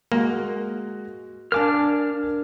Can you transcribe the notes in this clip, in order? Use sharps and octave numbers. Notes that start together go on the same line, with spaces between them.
G#3 A#3 F#4
D4 A#4 F5 G#5 A5 D6 F6